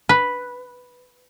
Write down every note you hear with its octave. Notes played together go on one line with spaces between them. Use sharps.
B4